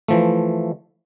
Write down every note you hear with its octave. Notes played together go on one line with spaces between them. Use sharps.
E3 F3 A3